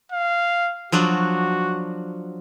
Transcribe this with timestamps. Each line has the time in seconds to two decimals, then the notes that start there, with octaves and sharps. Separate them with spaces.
0.12 F5
0.92 F3 F#3 D4 F#4